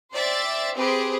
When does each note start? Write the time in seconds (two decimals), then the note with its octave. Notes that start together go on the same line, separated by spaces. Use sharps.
0.13 C5 D5 E5 G5 A6
0.76 C4 G4 G#4 B4 C5